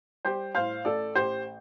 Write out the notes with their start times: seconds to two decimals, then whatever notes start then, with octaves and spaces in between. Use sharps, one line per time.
0.25 G3 G4 C5
0.55 A2 C5 F5
0.85 A1 A4 D5
1.15 A1 G4 C5